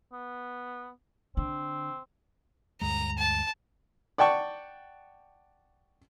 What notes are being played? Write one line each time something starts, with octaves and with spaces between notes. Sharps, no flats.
B3
D3 C4
D2 G2 G#3 A#5
A5
D5 F#5 G5 A5 C#6